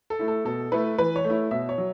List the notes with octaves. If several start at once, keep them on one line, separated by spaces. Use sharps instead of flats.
A4
A3 E4
A4
B2 A4
A3 E4 B4
E3 B4
C#5
A3
E4
B2 E5
C#5
F#3